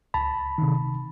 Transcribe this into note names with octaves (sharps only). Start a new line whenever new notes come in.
C#2 A5 B5
C3 D#3